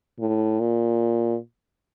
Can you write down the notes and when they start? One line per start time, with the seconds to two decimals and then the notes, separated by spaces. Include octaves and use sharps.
0.19 A2
0.60 A#2